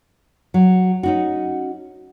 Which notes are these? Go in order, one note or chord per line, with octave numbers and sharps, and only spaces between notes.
F#3
C#4 D#4 F#4